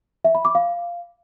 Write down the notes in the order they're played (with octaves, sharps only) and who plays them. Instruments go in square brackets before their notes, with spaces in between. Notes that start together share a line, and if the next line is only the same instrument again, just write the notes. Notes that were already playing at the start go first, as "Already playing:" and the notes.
[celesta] E5
B5
D6
F5